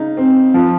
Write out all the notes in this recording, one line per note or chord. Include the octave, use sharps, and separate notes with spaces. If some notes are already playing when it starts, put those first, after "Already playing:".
Already playing: C#3 D#4
C4
F3